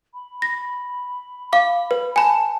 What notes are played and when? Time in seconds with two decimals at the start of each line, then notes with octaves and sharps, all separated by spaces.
0.14 B5
0.42 A#6
1.53 F5 D6
1.91 B4
2.16 G#5 A5 B5